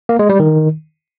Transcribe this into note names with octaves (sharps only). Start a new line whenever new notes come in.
A#3
G#3
G3
D#3